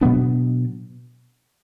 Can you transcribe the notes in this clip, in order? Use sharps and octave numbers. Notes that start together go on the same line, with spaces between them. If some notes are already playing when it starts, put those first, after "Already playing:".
B2 F#3 B3 D4